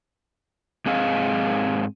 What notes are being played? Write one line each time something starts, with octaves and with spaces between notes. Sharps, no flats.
G#2 C4 G#4 D#5 F5